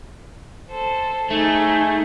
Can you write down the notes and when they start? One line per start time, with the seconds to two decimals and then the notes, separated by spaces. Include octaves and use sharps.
0.71 A4 C5
1.30 A3 D#4 G#4